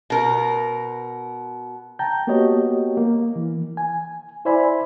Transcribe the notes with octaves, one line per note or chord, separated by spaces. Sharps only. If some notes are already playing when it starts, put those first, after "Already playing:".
B2 A#4
G5 A5 A#5 G6
A#3 B3 F#4 G4 C#5 D#5
A#3
E3
G#5
E4 C5 D5 E5 G#5 B5